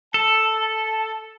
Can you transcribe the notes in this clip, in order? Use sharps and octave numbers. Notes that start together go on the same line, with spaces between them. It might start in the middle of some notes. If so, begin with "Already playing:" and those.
A4 A5